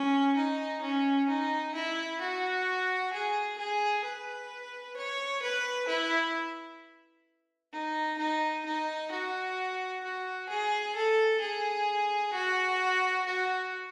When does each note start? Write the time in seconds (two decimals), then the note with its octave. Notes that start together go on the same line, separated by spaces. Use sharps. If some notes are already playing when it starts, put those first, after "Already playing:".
Already playing: C#4
0.36 D#4
0.82 C#4
1.29 D#4
1.75 E4
2.21 F#4
3.13 G#4
3.58 G#4
4.04 B4
4.96 C#5
5.42 B4
5.88 E4
7.72 D#4
8.18 D#4
8.65 D#4
9.11 F#4
10.03 F#4
10.49 G#4
10.95 A4
11.41 G#4
12.33 F#4
13.26 F#4